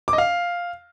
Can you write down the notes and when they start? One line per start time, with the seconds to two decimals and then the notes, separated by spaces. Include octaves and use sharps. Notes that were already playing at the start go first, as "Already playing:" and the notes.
0.08 D6
0.13 D#5
0.18 F5